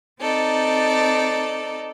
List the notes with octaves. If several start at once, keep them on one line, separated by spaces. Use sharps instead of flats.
C4 D#4 A4 D5